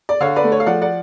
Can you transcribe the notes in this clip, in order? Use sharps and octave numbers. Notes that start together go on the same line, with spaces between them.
D5
D3 C#5 F5
B4 D5
A3
C#5
F5
F3 D5 F#5
D5 F#5